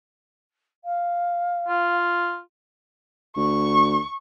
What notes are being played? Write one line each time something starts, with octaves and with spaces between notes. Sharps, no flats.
F5
F4
D2 C#6